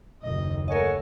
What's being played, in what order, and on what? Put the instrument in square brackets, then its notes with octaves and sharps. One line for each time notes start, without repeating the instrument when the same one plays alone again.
[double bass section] F#1 D#2 [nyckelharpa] D#5
[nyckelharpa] A3 [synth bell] A#4 D#5 [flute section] C#5 F#5 G#5